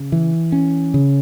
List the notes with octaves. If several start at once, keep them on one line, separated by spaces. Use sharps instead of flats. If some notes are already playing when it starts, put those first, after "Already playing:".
Already playing: C#3
E3
C#4
C#3